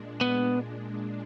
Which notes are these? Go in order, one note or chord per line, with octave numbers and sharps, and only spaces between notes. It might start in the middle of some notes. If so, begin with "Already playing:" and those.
Already playing: A#2 G#3 D4
B3